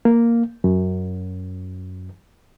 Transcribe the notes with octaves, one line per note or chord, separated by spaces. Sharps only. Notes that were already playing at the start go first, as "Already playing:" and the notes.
A#3
F#2